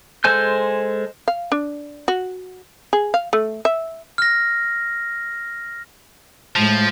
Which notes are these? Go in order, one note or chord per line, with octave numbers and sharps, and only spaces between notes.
G#3 A4 C5 G#5 G6
F5
D4
F#4
G#4
F5
A3
E5
F6 A#6
A2 F3 G#3